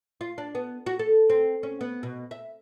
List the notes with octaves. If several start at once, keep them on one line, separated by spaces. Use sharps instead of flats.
F4
D4
B3
F#4
A4
C4
C#4
B3
B2
E5